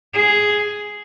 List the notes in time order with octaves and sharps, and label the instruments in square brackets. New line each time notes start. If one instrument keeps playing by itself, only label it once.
[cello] G#4